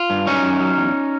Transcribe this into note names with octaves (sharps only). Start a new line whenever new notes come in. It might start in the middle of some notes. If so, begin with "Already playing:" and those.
Already playing: F4
G2
F#3 C#4 D#4
F#2
F#3
E2